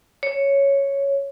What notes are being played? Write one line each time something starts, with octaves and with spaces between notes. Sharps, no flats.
C#5